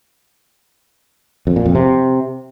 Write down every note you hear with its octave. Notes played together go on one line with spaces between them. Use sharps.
F2
A#2
F2
C3